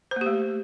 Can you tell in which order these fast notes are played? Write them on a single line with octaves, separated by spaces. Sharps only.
C5 A#3 G4 A3